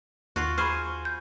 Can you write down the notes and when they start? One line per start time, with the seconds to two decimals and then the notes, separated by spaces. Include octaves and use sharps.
0.36 D#2 F4 F#4
0.58 G#4 C5 B5 C#6 F6
1.05 G6